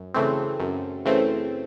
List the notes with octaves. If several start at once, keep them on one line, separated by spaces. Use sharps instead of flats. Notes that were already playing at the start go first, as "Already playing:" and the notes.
Already playing: F#2
C#3 E3 A3 C4
F#2
C#3 E3 A3 C4